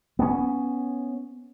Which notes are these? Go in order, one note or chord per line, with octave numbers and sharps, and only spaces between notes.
B3 C#4